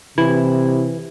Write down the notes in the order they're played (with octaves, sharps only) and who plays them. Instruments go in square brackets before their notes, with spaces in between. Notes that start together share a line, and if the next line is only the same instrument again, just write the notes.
[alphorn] C3 [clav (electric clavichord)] E3 [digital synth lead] E4